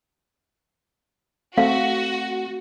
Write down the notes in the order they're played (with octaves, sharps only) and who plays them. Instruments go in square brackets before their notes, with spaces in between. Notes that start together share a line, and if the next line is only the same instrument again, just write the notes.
[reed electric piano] A3 C4 [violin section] F#4 [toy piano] F5